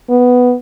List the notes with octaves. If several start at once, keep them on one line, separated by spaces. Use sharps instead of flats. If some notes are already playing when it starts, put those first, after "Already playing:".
B3